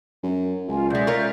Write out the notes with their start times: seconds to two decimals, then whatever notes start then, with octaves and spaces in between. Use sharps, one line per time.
0.23 F#2
0.68 C#2 F4 G#5
0.90 B2 G#3 D5 E5 G6
1.07 F4 A#4 C#5